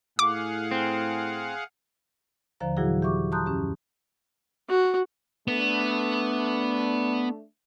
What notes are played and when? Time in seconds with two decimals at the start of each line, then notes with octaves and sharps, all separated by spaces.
0.19 A2 G#4 F5 F#5 D6
0.71 C4
2.60 D#2 D3 F3 C5 F5 A#5
2.77 A#2 E3 F#3 E4 F#4 G#4
3.02 G4 E5 C#6 D6
3.32 A5 A#5 C6 D#6 F#6 G6
3.46 F#2 C#4 G4
4.69 F#4
5.48 A3 B3 D4